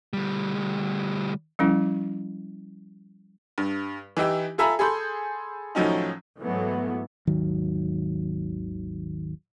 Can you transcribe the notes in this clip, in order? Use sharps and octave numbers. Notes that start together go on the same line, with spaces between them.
D2 G3
F3 G3 C#4 E4
G2
E3 D#4 E4 G4
F4 A4 E5 G#5 A#5 B5
G#4 A4 B5 C6 G6
A2 D#3 F3 F#3 C#4 D#4
G#2 E3 F#3 A3 B3
G#1 D#2 D#3 F#3